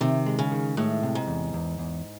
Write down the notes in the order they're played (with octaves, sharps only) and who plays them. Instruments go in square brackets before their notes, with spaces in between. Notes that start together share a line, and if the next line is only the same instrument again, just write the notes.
[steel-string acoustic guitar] C3 [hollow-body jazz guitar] D#3
[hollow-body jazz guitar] G#3
[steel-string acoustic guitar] C#3
[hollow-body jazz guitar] D#3
[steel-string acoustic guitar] A2 [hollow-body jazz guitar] G#3
[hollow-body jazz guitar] C3
[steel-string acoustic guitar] G#2
[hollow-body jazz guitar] E2
E2
E2